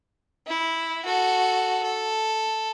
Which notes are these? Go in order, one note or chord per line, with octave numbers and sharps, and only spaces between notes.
E4
F#4 A4
A4